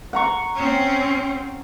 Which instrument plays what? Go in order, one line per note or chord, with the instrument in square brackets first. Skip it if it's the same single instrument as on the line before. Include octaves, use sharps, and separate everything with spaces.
[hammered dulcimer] F#5 A#5 C#6
[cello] C4 C#4